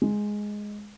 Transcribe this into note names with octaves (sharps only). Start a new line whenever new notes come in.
G#3